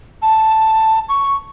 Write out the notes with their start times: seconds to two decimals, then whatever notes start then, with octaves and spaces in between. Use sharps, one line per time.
0.22 A5
1.09 C#6